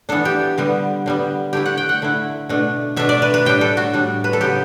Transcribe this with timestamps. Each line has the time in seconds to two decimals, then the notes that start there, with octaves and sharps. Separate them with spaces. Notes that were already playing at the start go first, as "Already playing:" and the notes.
0.09 E3 B3 D4 A4
0.25 G4
0.58 D3 G3 B3
1.06 D3 G3 B3
1.53 D3 A3 E4 G4
1.66 F#5
1.77 G5
1.89 F#5
2.02 D3 A3 E4
2.49 B2 A3 D4
2.96 B2 A3 D4 E5
3.09 D5
3.22 B4
3.34 B4
3.45 A2 G3 D4 G5
3.61 A4
3.77 F#4
3.93 A2 G3 D4
4.24 B4
4.33 A4
4.41 C#3 F#3 B3 G4